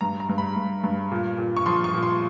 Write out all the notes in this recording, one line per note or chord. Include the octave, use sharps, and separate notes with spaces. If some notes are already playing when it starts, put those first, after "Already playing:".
G2 A#5
A#5
G2
B5
G2
G2
A#2
A#2
C#6
F3 C6
C#6
A#2
C6